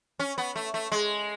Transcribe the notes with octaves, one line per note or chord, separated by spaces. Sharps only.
C#4
B3
A3
A3
G#3